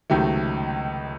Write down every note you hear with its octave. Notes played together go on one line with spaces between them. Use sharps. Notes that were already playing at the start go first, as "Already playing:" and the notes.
C#2 C3 D#3 F#3 A3